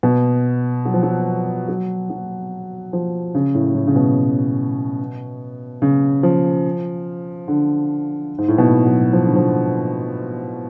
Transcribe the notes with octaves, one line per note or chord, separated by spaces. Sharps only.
B2
F#3
F3
F#3
F#3
F#3
F3
C#3
A2
A2
C#3
B2
C#3
F3
D3
G#2
A2
B2
F#3
F3
D3
F3